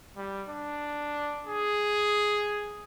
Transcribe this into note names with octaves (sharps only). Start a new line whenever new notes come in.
G3
D4
G#4